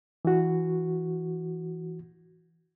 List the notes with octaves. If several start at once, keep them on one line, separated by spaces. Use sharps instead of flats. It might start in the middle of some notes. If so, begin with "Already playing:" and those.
E3 F#4